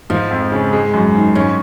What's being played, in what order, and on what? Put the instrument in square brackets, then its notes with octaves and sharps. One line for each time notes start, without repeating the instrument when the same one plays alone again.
[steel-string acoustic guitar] G#2 [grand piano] F3
[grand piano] F2
C#3
G#3
F#2
D#3
[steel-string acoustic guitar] G#2 [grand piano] C#4